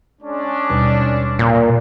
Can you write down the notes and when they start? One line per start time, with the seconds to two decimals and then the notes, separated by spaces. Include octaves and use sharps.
0.22 G#3 C#4 D4
0.70 D#2 B2 G3
1.39 A#2